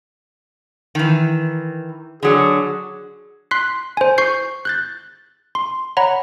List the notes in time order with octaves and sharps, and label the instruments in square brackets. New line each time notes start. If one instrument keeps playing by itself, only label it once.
[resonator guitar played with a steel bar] D#3 E3
[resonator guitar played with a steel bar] D3 F#3 [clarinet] G#4
[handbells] C6 F#6 B6 C7
C5 G#5
C#6 G6 C7
F#6 G6 A6
C6
C#5 F#5 A#5 B5